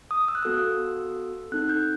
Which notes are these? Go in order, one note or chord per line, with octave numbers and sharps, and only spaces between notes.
D#6
E6
F#6
B3 F#4 A4 E6
C4 D#4 A4 F#6
G6